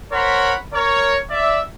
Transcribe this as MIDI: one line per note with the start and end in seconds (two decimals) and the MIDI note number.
0.12 0.55 70
0.12 0.55 72
0.12 0.55 73
0.12 0.55 78
0.12 0.55 83
0.73 1.17 70
0.73 1.17 73
1.30 1.60 74
1.30 1.60 76